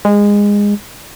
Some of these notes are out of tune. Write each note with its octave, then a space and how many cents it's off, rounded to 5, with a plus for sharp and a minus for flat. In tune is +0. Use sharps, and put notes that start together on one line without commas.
G#3 -20